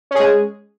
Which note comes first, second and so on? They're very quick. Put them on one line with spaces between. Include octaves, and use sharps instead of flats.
C#4 G#4 G#3